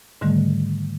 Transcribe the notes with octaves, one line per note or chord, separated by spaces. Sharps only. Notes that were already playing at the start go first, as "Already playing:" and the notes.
G#2 D3 D#3 G3 A3